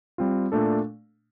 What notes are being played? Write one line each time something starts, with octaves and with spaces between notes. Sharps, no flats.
G3 C4 F4
A#2 A3 D4 A4